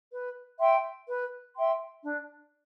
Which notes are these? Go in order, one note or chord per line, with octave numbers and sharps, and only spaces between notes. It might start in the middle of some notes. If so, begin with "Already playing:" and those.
B4
E5 G5 C6
B4
E5 G5 C6
D4